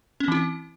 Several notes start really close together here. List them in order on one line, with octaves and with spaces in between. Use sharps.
C#4 C4 E3 E4